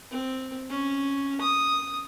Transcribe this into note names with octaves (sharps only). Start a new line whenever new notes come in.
C4
C#4
D#6